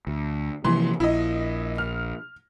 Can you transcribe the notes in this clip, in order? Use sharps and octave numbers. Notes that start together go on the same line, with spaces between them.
D2
C3 E3 F3 A#3 C6
A#1 E4 D#5
F6